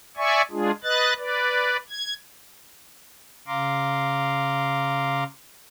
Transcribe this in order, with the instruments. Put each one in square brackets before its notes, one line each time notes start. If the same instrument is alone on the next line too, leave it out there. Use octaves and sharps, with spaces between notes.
[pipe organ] D5 E5 G#5 C#6
G#3 D4 F4 G#4
B4 D#5 F#6 A6
B4 D5
G#6
C#3 F5 A#5 C6 D6